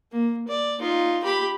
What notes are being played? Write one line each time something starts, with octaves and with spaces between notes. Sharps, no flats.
A#3
D5
D#4 F4
G4 B5